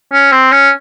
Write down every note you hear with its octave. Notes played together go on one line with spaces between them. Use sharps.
C#4
C4
C#4